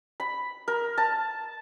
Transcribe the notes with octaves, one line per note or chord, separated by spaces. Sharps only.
B5
A#4
A5